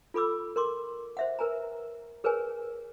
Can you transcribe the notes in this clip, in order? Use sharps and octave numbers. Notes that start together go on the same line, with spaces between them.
F4 A4 B5 D6 E6
A#4 C6 D6
C5 E5 F#5
A#4 B4 G#5 A#5
G#4 A#4 B4 C#5 G#5